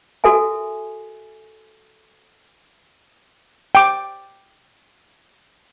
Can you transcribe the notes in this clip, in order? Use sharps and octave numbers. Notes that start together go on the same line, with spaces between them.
F#4 A4 A#4 E5 G#5
G5 D6